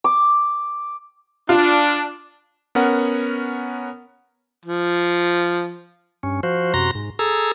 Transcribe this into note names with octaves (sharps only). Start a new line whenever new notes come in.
D6
D4 F4
B3 C#4 A#4 F#5
F3
G2 C#4
F3 F#4 C5
F#2 C3 F#4 A#5 C6 A#6
G#2
G#4 A4 A#5 E6